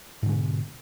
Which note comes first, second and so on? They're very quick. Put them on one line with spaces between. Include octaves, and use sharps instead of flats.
G#2 D3 G#3 B2